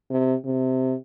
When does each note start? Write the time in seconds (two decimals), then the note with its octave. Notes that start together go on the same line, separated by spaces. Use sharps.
0.10 C3
0.45 C3